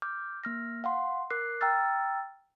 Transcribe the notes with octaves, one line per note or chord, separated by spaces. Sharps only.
D6 F6 G6
A#3 F6 A#6
F5 F#5 C6
A#4 D6 F#6 C7
G5 A#5 E6 F6 A6